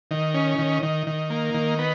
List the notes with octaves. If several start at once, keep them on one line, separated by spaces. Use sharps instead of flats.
D#3
C#4
D#3
D#3
D#3
A#3
D#3
B3